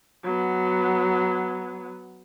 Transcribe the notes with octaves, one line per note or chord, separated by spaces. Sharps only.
F#3 B3